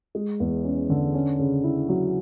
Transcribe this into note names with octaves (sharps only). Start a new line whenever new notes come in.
G#3
E2
C#4
D3
C#4
C#3
E4
F#3